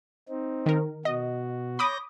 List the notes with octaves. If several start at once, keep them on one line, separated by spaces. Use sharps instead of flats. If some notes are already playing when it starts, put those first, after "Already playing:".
C4 D#4
D#3 A#4
B2 F#4 D#5
C#5 B5 D6 D#6 G6 A#6